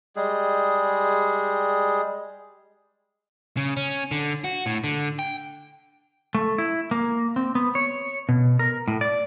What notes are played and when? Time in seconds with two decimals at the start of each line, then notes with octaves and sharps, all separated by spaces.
0.16 G3 G#3 G#4
3.57 C#3
3.77 C#4
4.11 D3
4.44 F#4
4.66 A2
4.84 D3
5.19 G5
6.35 A3
6.58 E4
6.91 A#3
7.36 C4
7.55 B3
7.75 C#5
8.29 B2
8.59 A#4
8.88 A2
9.01 D5